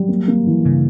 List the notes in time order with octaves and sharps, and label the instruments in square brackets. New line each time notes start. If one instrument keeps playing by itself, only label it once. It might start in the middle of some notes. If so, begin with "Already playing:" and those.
Already playing: [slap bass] F#3 [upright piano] G3
[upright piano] A#3
A#3
E3
[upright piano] G2 [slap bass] C#3